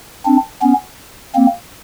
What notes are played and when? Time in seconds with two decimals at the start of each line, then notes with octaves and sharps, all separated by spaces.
0.26 C4 D4
0.62 B3 C#4
1.35 A#3 C4